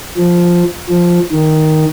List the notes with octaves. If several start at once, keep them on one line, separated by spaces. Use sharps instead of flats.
F3
F3
D#3